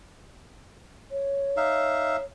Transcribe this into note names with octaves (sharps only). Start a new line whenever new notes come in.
C#5
D#4 E5 F5